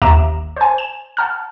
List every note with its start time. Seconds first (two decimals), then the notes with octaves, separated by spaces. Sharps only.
0.02 G1 D#2 E5 A#5 D6 E7
0.56 C5 G#5
0.78 E7
1.17 F#5 A5 F6